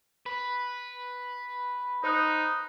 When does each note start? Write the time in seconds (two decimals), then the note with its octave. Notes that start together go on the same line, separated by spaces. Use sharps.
0.26 B4
2.04 D#4 C5 D#6 F#6